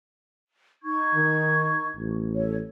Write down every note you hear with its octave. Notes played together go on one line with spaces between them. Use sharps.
D#4 C#6 G#6
D#3
A1
A4 C#5